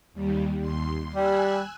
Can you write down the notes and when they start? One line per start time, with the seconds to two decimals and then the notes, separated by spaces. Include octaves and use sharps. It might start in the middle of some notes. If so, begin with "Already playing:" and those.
0.13 D#2 G3
0.58 D#2 C6
1.15 G3 G#5 E6 F#6